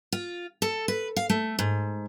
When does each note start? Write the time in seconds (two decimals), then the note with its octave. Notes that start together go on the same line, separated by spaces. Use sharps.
0.12 F4
0.62 A4
0.88 B4
1.16 F5
1.30 A3
1.59 G#2